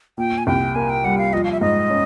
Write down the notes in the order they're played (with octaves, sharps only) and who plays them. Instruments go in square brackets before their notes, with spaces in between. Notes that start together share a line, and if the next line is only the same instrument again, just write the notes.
[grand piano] A#2 [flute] G5
[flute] G#5
[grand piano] C2 [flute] G5
[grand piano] A#3 [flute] G#5
[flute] G5
[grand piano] G3 [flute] F#5
[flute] F5
[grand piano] F3 [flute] D#5
[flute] F5
E5
[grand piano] G#2 [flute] D#5
[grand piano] C#4